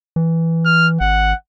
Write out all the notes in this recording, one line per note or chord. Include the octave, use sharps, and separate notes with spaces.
E3
F6
G#1 F#5